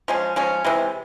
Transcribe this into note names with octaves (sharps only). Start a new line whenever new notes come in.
F3 G#3 C#4
F3 G#3 C#4
C3 E3 G#3